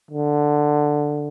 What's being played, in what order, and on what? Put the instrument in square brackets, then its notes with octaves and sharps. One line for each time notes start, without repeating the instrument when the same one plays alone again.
[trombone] D3